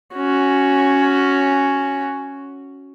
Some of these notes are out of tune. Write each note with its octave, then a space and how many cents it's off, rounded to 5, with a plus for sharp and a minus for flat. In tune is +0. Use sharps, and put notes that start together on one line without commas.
C#4 +0 F#4 +0